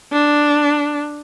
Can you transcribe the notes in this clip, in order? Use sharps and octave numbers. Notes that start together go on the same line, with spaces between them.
D4